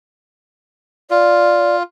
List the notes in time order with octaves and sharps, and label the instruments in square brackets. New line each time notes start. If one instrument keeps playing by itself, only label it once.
[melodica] F4 [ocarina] D5